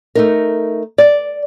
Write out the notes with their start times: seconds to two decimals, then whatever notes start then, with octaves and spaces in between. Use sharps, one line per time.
0.15 A3 D#4 A#4
0.98 D5